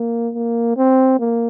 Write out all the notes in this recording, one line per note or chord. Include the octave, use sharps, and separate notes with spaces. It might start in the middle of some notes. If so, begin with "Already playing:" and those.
Already playing: A#3
A#3
C4
A#3